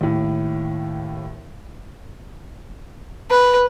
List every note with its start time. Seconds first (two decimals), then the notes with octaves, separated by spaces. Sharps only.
0.01 D#2 A2
3.30 B4